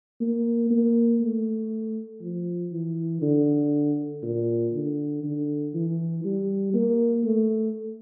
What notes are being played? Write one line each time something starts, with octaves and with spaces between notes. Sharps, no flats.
A#3
A#3
A3
F3
E3
D3
A#2
D3
D3
E3
G3
A#3
A3